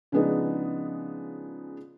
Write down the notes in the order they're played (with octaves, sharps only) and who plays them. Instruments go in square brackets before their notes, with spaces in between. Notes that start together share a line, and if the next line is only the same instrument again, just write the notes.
[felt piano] C#3 F3 G#3 B3 D4 D#4